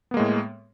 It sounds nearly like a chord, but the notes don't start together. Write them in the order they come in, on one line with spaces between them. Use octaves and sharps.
B3 A#3 G#3 A2